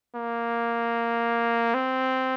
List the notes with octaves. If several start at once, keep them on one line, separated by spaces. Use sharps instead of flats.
A#3
C4